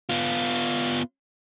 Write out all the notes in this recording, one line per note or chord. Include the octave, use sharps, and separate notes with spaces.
B3 F4